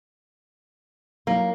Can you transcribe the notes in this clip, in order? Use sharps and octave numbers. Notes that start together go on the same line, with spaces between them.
F#3 A#3 D#4 E4